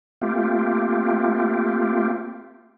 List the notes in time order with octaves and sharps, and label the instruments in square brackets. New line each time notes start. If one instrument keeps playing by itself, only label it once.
[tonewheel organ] A3 A#3 C4 F4 G4